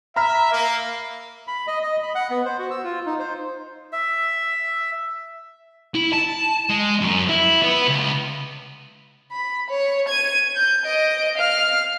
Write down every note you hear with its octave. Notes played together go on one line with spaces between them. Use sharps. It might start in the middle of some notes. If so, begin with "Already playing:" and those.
E5 A#5 B5 F6
A#3
B5
D#5
D#5
B5
F#5
B3
C5
F#4
E6
F4
D#4
C5
E5
E4
A5
G#3
F#2
E4
B3
C#2
B5
C#5
G#6 D#7
G6
D#5 D7
F5 F6